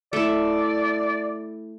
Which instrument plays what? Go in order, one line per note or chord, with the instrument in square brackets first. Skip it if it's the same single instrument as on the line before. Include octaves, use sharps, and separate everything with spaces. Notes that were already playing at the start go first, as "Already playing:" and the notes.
[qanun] A3 E4 [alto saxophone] D5